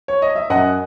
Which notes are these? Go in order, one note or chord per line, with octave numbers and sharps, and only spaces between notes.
C#5
D#5
E5
F#2 D#5 F#5